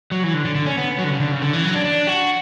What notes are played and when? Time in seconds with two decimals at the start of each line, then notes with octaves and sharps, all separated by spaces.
0.11 F#3
0.23 E3
0.33 D3
0.45 D3
0.55 D3
0.66 C#4
0.78 B3
0.99 F#3
1.04 D3
1.09 C#3
1.20 D3
1.32 C#3
1.42 D3
1.53 E3
1.64 F#3
1.74 D4
1.85 D4
2.07 F#4